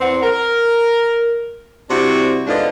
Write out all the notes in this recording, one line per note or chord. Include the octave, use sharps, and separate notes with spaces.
E2 C4 F#5
A#4
C3 G3 C4 D4 E4 F#4
G#2 D3 B3 D4 F4 D#5